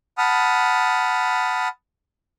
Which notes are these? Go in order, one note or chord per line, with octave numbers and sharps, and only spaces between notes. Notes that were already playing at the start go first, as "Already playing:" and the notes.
F#5 A5 B5 D#6 F6